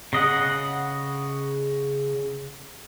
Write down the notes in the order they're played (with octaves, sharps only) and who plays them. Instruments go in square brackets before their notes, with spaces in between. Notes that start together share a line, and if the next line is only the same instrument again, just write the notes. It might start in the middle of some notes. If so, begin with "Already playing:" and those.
[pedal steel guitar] C#3 D#5 F#5